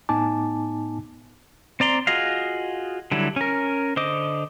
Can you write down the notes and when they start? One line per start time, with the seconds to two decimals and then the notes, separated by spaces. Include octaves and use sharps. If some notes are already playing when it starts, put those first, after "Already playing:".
0.09 A2 B3 D#4 G#5 A5 D6
1.80 C4 D5 A#5 C6
2.07 F4 F#4 G#4 D#5 F5
3.11 D3 F#3 G3 E4
3.36 C#4 A#4
3.96 D3 C5 D#5 D6